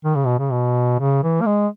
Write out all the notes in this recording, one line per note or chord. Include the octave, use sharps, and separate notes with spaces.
D#3
C#3
B2
C#3
B2
C#3
E3
A#3
G#3